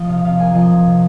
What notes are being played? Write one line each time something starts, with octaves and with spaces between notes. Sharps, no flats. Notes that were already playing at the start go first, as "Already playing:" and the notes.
Already playing: F3 D#5
C3 F5
C3 F5
A#3 D#5 G#5
F3 D#5 G#5
C3
C3